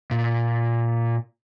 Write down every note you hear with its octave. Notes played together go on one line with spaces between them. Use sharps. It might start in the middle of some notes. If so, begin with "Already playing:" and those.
A#2